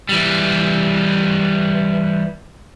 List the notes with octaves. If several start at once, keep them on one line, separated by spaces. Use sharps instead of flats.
E3 G3